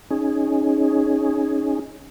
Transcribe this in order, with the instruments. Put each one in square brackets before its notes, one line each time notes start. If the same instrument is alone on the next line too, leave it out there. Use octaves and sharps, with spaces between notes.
[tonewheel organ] C#4 D#4 G#4